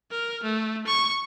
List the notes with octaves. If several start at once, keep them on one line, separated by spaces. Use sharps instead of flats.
A#4
A3
C#6